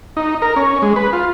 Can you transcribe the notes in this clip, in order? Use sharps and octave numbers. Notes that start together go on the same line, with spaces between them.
D#4
A#4
C#4
G#3
B4
F4